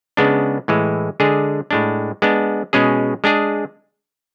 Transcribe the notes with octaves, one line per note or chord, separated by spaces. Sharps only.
C#3 G#3 B3 D4
A2 E3 G#3
D3 G#3 D4 G#4
A2 G#3 D4
G#3 B3 D4
B2 G#3 C#4 G#4
G#3 D4 G#4